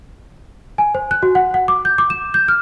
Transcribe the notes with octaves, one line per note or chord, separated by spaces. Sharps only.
G#5
C5
F#6
F#4
F#5
F#5
D6
G6
D6
E7
G6
F6